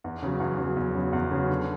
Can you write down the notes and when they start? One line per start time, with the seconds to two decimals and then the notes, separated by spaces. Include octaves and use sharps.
0.04 E2
0.23 C#3 F#3
0.40 E2
0.58 C#3 F#3
0.77 E2
0.95 C#3 F#3
1.13 E2
1.31 C#3 F#3
1.49 D3